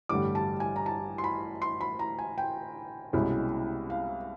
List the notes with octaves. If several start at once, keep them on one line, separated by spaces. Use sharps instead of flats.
A1 G2 D3 G3 D6
A5
G#5
A#5
A5
C6
B5
C6
B5
A#5
G#5
G5
C2 B2 G#3 C#4 E4
F5